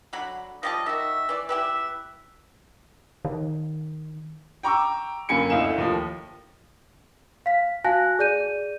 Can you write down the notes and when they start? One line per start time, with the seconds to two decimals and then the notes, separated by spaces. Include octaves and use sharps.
0.13 D3 F#3 B5
0.63 F3 G3 D#5 A5
0.86 D#3 F#4 E5
1.29 E3 D5
1.49 E4 G4 B4 E5
3.25 D#3
4.63 G5 A#5 C#6 D6 E6
5.29 G1 F#2 A#3 G#5 B5 C#7
5.50 G1 D2 E4 D#5 F5 E7
5.78 D#2 F3
7.46 F5 B6
7.84 F#4 F5 G#5 A5 F#6 A#6
8.19 G#4 D5 G6 D#7